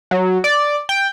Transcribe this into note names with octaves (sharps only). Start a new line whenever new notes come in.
F#3
D5
G5